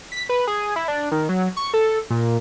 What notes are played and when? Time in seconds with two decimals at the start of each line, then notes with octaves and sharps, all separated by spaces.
0.12 B6
0.29 B4
0.47 G#4
0.76 E4
0.88 D4
1.12 D#3
1.29 F#3
1.57 C#6
1.74 A4
2.10 A#2